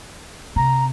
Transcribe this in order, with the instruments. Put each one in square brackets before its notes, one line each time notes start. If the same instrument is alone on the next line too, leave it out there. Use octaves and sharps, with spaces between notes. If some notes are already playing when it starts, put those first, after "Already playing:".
[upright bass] C3 [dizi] A#5